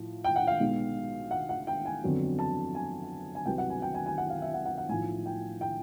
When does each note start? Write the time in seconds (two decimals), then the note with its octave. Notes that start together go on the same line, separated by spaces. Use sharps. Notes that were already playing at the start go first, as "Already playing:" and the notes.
Already playing: A2 F3
0.24 G5
0.36 F#5
0.47 F5
0.60 B1 B2 G#3
1.31 F#5
1.49 F#5
1.67 G5
1.85 G#5
2.03 G1 F2 D3 F#3 B3
2.39 A5
2.75 G#5
3.35 G#5
3.46 C2 B2 F#3 B3 G5
3.58 F#5
3.70 G#5
3.82 G5
3.94 G#5
4.06 G#5
4.18 F#5
4.30 F5
4.42 E5
4.54 F#5
4.66 F#5
4.78 F#5
4.89 B1 A2 F3 G#5
5.26 G5
5.61 G5